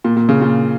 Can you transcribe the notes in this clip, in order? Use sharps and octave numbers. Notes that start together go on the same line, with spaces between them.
A#2
A#2
C#3
A#2